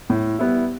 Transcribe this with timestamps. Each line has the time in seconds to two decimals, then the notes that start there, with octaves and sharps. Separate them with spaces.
0.10 A2
0.39 G3 B3 E4